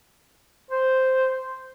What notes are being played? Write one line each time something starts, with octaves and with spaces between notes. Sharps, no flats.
C5